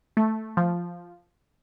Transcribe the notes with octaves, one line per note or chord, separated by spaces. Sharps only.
A3
F3